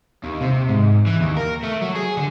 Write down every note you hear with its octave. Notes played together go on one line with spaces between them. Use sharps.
D#2
C3
G#2
E3
D#2
A#4
A3
F#3
G#4
D3